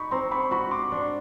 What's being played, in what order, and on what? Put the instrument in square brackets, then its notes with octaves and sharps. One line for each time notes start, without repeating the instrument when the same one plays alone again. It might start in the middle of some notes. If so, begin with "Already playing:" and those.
Already playing: [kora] D#4 [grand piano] B5 C#6
[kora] C4 [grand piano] A#5 C6
[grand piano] B5 C#6
[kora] F#4 [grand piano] B5 C#6
[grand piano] C6 D6
[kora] D4